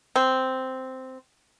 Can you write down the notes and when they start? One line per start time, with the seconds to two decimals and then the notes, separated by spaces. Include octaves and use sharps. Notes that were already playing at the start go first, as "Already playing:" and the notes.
0.16 C4